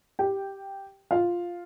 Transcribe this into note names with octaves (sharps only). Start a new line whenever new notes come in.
G4 G5
F4 F5